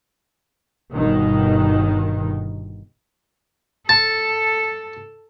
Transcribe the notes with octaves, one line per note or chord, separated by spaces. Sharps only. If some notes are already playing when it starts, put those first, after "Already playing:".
G1 B2 D#3
A4 A5